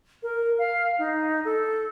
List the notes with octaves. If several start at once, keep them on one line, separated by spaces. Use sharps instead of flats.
A#4
F5
D#4
A4